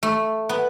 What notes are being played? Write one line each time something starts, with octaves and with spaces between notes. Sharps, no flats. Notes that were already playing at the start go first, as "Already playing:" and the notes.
A3
B3